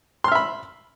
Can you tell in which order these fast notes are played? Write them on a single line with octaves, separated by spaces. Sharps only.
C6 F6 E5 B5